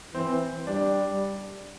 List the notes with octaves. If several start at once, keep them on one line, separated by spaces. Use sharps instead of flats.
E3 C4
G3 D4